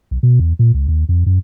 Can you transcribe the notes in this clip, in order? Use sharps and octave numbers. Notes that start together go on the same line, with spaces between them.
B1
B2
E2
A#2
C#2
D#2
F2
F#2